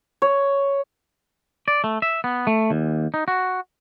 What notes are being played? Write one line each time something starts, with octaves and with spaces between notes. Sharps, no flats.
C#5
D5
A3
E5
B3
A3
D#2
D#4
F#4